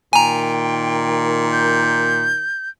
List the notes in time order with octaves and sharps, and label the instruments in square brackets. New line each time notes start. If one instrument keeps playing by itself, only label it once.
[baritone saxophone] A#2 [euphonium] D#3 [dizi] G5 [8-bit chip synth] G#5 A#5
[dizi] G6